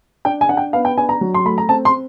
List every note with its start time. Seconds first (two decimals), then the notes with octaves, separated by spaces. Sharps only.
0.25 D4 G5
0.41 G#5
0.49 D4 F#5
0.57 G5
0.73 B3 F5
0.85 G5
0.98 D4 G#5
1.09 A#5
1.21 F#3
1.34 C6
1.45 A3 B5
1.58 A#5
1.69 C4 A5
1.85 C6